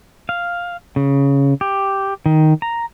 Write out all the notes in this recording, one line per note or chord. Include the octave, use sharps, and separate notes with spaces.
F5
C#3
G4
D#3
A#5